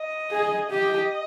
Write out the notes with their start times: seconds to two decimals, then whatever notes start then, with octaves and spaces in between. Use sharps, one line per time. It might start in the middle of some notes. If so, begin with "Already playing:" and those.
Already playing: D#5
0.31 G#4
0.70 G4 D#5